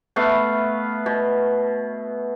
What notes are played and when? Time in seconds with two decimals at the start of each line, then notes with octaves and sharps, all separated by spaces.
0.16 A3 B3 B4 F5
1.06 B2